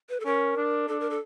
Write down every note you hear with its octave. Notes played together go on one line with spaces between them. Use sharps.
B4
A4
C#4 A#4
D4
D4 A4
A#4
A4